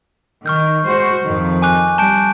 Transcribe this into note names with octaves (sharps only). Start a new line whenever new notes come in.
D#3 C#6 F6 G6
G#3 F#4 C5
F2 D#3
G#5 D6 F#6
G3 A5 G6 D7